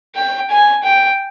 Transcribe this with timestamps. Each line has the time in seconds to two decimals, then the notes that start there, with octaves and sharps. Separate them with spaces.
0.15 G5
0.50 G#5
0.83 G5